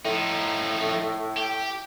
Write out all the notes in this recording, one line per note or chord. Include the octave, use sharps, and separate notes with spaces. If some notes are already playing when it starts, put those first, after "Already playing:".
A2 F3 D#4
G4